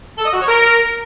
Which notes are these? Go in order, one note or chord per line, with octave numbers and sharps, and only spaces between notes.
A4
D#5
F#4
C#5
A#4